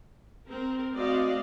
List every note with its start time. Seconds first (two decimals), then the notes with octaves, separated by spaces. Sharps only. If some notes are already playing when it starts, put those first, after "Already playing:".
0.48 C4 A#4
0.94 A3 C4 F#4 D5 D#5 F5